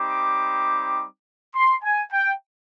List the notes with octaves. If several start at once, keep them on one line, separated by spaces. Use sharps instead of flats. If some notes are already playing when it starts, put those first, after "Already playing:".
Already playing: G3 C4 D#4 G4 D6
C6
G#5
G5